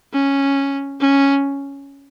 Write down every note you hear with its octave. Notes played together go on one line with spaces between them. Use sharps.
C#4
C#4